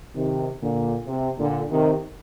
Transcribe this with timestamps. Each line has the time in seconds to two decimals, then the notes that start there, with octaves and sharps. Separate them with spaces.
0.14 C3 D#3
0.61 A#2 D3
1.07 C3
1.38 A#2 D3
1.70 C3 D#3